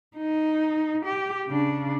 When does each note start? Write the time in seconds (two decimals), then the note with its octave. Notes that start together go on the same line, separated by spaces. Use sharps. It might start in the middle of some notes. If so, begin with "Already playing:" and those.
0.17 D#4
1.05 G4
1.48 C#3 D4